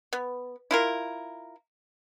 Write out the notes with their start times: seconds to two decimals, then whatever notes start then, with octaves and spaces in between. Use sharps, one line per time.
0.13 B3
0.71 E4 F4 A#4